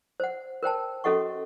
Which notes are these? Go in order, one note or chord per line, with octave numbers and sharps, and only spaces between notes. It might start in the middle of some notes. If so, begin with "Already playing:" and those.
C5 F#5
A#4 C5 G5 A5
C#4 F#4 A4 D#5 F#5 C#6